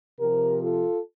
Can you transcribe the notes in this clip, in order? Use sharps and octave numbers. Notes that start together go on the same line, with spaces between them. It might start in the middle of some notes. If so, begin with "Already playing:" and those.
C3 F3 G4 A#4
F4 A4